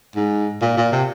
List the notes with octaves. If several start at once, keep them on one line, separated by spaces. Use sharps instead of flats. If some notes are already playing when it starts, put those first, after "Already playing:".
G#2
A#2
A#2
C3